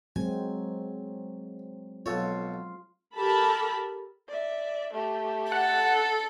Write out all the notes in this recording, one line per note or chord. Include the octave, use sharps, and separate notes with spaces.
F#3 G#3 C4 G#5
B1 F4 A4 C#5
G4 A4 A#4 A5 B5
D5 E5
A3 G4
A4 F#5